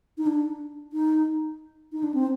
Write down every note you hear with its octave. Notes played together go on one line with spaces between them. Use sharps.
D#4
D4
D#4
D#4
D4
C4